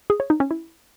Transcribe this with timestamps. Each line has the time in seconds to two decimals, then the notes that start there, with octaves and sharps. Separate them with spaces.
0.10 G#4
0.20 C#5
0.30 D#4
0.40 C#4
0.51 E4